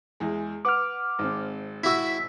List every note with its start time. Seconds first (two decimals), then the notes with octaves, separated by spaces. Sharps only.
0.20 E2 G#3
0.65 B4 F#5 D6 F6
1.19 G#1 C4
1.84 E4 F#4 E6 B6